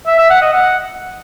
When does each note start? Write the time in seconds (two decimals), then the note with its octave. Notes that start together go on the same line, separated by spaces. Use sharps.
0.07 E5
0.19 E5
0.30 F#5
0.42 D#5
0.53 F#5